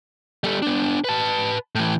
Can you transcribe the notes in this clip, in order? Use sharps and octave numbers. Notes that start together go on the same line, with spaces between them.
G3 A4
B3 D4
B4 A5
A2 E3